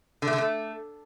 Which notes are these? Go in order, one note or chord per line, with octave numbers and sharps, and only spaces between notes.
D3
A3
D3
A3